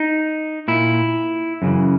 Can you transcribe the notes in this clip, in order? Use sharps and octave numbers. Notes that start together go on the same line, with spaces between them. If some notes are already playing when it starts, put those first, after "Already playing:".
Already playing: D#4
A#2 E4
F#2 C#3 E3